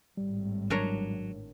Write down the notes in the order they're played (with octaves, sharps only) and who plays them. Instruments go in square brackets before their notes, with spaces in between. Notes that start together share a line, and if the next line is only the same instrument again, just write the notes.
[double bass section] G#1 A2 [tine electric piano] G3
[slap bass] F#3 [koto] D4 A#4 C#5